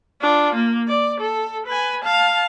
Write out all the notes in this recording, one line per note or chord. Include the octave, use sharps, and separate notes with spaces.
D4 F4
A#3
D5
A4
B4 G#5
F5 A5